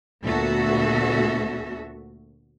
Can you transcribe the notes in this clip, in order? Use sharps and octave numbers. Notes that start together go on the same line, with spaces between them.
D2 A#2 B3 F#4 A4 E5